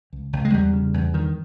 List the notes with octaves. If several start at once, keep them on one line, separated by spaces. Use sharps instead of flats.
C#2
C#2
G#3
E2 G3
C#3
E2
G2 D#3